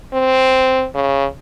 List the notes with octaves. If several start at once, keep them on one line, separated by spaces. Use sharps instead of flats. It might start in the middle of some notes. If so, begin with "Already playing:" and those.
C4
C#3